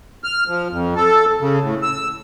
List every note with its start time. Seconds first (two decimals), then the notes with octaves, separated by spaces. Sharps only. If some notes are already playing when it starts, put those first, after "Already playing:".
0.24 F6
0.48 F3
0.70 F2
0.96 A4
1.41 C#3
1.62 A2
1.82 E6